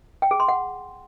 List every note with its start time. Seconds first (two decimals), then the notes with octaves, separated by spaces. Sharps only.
0.22 G5
0.31 G#4
0.40 C6
0.48 F#5